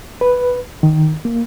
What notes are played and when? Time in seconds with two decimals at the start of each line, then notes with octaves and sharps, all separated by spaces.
0.21 B4
0.83 D#3
1.25 A#3